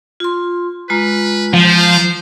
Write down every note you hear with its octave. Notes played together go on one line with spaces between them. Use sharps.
F4 C6
G#3 F4 B4 A#5
F3 C5